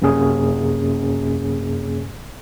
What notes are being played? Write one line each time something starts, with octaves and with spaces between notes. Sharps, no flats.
F#2 C3 A#3 C#4 G#4